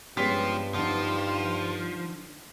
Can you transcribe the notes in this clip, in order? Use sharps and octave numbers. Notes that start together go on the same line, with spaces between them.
G2 F3 G#3 B3 C#4 G4 B6
D3 F3 D#4